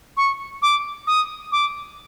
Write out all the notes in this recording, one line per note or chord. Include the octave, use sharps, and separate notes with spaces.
C#6
D6
D#6
D6